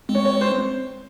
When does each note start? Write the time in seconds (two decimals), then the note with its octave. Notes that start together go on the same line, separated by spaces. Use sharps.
0.09 G#3 C4
0.15 C#5
0.25 C#5
0.41 C5